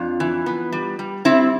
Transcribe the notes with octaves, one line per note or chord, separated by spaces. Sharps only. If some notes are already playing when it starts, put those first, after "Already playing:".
Already playing: F2 D4 F4
E3
B3
G3
G3
G3 C4 E4